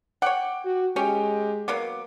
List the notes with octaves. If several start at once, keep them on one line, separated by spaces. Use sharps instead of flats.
C#5 F#5 G5 D6
F#4
G#3 C#4 G4 G5
F#3 A#3 B3 D6